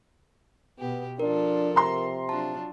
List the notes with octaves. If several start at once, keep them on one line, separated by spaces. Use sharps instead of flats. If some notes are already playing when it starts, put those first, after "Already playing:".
B2 B3 G4
F3 D4 F4 A4 A#4
C3 A#5 C6
F#3 D4 F4 A5